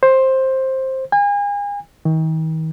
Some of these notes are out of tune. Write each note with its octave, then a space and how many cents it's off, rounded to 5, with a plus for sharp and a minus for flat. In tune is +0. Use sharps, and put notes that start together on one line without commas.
C5 +10
G#5 -35
D#3 +40